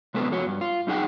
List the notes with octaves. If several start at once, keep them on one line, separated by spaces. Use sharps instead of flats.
C3 G#3 B3 A4 B4
F2 F#4 C#5
G2
F4
F#2 D#4 G#4 F#5 G5